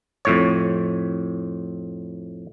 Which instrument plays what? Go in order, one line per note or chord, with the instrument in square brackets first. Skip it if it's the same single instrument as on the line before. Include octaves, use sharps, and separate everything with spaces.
[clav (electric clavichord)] F2 A2 C#5